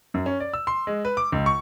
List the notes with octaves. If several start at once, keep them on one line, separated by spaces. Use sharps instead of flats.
F#2
C#4
D5
E6
C6
G#3
B4
D6
C#2
C#6